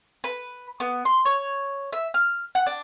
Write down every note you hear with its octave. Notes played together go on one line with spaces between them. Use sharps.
B4
B3
C6
C#5
E5
F6
F#5
D4